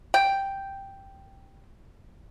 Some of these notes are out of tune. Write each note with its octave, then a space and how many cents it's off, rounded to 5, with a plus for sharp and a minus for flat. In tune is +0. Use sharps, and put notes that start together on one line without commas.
G5 +0